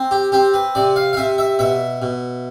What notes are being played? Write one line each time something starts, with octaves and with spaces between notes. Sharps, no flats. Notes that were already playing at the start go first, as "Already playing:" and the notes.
Already playing: C4
G4
C4 G4
B4
C3 D5
F5
F5
C3 E5
E5
B2 E5
B2